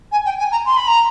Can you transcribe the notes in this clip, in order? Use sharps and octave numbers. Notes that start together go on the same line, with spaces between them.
G#5
G5
G#5
A#5
C6
B5
A#5